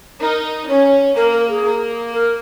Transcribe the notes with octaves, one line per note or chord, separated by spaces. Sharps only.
D#4 A#4
C#4 C#5
A#3 A#4
A#4
G#4
A#3
A#4